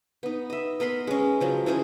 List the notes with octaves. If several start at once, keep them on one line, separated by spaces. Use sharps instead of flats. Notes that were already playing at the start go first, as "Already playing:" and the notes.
B3 D#4
D#5 E5
B3 A#4 B5 C6
G#3 C#4
C#3 F3 F#3
E3 C#4 G#4 C5